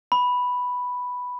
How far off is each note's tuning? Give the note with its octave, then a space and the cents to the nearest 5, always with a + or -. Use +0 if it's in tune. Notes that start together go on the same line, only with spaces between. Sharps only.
B5 +0